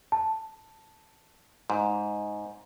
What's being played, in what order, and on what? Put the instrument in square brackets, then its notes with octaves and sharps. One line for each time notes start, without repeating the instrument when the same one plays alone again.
[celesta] A5
[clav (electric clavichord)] G#2